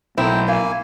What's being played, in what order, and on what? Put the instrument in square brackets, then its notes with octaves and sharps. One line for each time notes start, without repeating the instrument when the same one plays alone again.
[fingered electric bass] B1 [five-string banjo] A3 A#3 C4 [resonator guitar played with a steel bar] E4 [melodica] G5
[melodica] A#3 G#5 [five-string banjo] F5